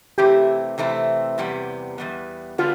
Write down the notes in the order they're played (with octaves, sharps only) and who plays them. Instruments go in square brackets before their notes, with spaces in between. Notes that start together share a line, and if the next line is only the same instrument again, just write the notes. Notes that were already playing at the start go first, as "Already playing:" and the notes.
[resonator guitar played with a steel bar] C3 E3 A3 C4 E4 [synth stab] G4
[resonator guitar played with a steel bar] C3 E3 A3 C4 E4
E2 C3 G3 B3
E2 C3 G3 B3
[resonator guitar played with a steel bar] D3 G3 B3 D4 [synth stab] F4